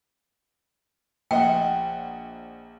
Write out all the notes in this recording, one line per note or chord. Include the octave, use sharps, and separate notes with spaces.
A#1 D#5 F#5 G5